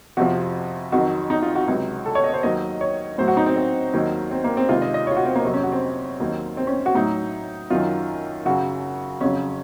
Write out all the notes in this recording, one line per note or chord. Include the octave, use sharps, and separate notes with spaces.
F2 C3 F3 F#4
F2 D#3 F#3 F#4
D#4
F4
F#4
C#2 C3 F#3
A4
C#5
D#5
C5
D#2 D#3 F#3 D#5
C#5
A2 F#3 C5
F#4
D#4
C4
C4
D#2 D#3 F#3
C4
A#3
C4
C#2 C3 D#3 F4
D#5
D#5
F4 C#5
F#4
C4
A#3
F2 C3 F#3
C#4
F#4
C4
D#2 D#3 F#3
C4
C#4
F#4
A2 F#3 D#4
F#2 D#3 F#3 F4
F#2 C#3 F#3 F#4
F2 C#3 F#3 C#4